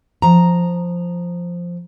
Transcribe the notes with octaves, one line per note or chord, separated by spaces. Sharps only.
F3 A#5